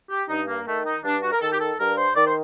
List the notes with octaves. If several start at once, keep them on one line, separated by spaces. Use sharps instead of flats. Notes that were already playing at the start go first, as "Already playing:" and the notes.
G4
G2 D#4
A#3
D#3 A3
D#4
G2 D4
F#4
A#4
D#3 A4
G4
A4
G2 A#4
C5
D#3 D5
C5